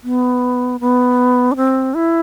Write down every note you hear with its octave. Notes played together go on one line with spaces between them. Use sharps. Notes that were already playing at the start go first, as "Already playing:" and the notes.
B3
B3
D4
C4
E4